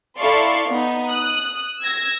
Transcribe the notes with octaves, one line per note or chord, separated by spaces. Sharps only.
E4 A4 D5 F5 C6 C#6
B3 D#4
D#6 F#6
E6 G#6 A#6